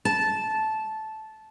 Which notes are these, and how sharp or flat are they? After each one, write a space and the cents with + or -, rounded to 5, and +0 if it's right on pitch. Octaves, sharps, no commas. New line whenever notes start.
A5 -10